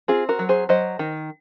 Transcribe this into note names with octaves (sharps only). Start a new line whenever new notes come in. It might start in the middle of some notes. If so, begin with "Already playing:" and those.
C4 F4 G#4
F#4 A#4
F#3
G#4 C5
F#3 C5 D#5
D#3